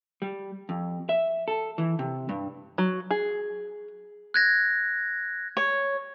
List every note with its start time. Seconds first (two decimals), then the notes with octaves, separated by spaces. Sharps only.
0.22 G3
0.69 F2
1.09 E5
1.48 A4
1.78 E3
1.99 C3
2.29 G2
2.78 F#3
3.11 G#4
4.34 F#6 G#6 A#6
5.57 C#5